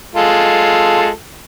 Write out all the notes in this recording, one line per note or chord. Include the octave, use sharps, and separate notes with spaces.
G#3 F4 A4